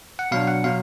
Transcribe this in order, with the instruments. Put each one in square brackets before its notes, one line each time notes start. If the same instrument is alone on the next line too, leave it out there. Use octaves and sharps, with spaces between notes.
[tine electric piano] F#5
B2 F#3 D4 F5
F#5
B2 F#3 F5